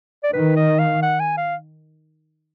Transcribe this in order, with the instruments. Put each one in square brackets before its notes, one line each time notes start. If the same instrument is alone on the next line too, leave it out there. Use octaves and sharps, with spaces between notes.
[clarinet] D5
[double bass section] D#3 [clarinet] B4
[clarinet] D#5
F5
F#5
G#5
F5